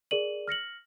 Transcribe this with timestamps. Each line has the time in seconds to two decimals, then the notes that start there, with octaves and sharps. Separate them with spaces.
0.11 G#4 A#4 D5 D#7 F#7
0.48 F6 A#6 C#7 F#7